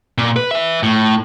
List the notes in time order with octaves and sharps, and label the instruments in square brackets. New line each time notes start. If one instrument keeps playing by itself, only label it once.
[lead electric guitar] A#2
B4
B4 E5
A2